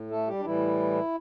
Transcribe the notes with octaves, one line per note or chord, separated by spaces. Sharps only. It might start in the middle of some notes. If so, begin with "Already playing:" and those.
Already playing: A2
A3 A4
G3 G4
D4
A2 E3 G3 E4